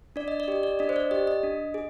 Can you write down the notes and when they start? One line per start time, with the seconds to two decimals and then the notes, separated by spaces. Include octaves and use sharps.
0.16 D4 D5
0.28 D#5
0.40 D5
0.48 G4 D#5
0.63 D5
0.79 D4 D#5
0.89 C5
0.96 D5
1.11 G4 D#5
1.27 D#5
1.43 D4
1.74 G#4